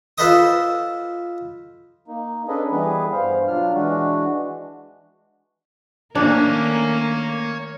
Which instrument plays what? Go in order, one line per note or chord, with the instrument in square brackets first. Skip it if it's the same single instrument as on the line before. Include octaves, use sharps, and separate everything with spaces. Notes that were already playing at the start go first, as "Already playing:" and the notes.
[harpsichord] F4 A4 B4 C5 D#5 D#6
[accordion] A#3 D#4
C#4 D4 G#4 A4 B4 D#5
E3 G3 B3 G#4 B4
G2 C5 F5
B2 F#3 D4 F4 F6
E3 G#3 D4 F#4
[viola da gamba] D#3 A3 A#4 [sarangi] A#3 [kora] D4 [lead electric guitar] C#5 G#5